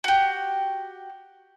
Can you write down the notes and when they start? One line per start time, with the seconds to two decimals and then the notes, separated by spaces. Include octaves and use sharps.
0.04 F#4 G4